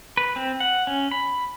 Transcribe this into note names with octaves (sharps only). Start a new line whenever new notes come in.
B4
C4
F#5
C#4
B5